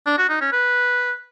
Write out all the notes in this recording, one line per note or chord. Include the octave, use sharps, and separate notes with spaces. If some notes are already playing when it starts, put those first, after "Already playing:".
D4
F#4
D#4
C#4
B4